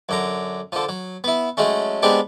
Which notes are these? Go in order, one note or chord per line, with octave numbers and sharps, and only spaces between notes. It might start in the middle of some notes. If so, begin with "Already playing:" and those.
F#2 D3 A#5
D3 F3
F#3
B3 E4
F#3 G#3 A3 C#4
G#3 B3 C4 D4 G4